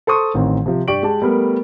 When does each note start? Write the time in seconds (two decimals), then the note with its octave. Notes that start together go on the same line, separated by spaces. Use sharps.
0.07 A4 C5 C6 C#6 D#6
0.34 A1 D#3 C4
0.66 C3 F3
0.88 G2 G4 D5 C#6 D7 F#7
1.03 G#3 G4 A5
1.22 G3 A3 B3 A#4